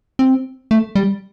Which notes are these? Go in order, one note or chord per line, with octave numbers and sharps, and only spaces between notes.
C4
A3
G3